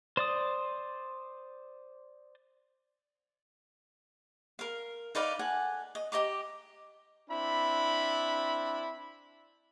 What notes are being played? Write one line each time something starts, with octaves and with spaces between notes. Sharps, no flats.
C5 D5 D#6
A#4 F5
D#4 B4 D5 F5
A4 F#5 G#5
D#5
G4 D#5 A#5 D6
C4 D4 E4 B5